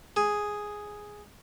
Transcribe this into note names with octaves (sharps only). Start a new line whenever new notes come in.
G#4